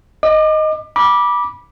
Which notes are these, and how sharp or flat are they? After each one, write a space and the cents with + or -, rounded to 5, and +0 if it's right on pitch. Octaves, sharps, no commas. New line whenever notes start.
D#5 +0 D6 +30
B5 -20 D6 +0